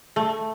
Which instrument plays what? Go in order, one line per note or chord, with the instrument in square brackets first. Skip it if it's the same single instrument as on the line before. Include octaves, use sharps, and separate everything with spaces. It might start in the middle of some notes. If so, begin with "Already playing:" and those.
[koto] A3